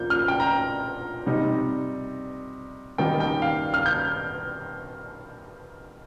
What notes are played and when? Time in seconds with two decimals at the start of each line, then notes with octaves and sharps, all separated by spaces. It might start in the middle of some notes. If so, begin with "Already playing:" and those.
Already playing: A#2 F3 A#3 G6
0.10 F6
0.28 G5
0.40 A#5
1.26 C3 G3 D#4
2.98 D#3 G3 A#3 D#4 G5
3.20 G5
3.42 F5
3.74 F6
3.86 G6